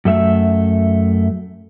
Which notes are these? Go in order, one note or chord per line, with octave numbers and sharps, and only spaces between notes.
F#2 A3 E5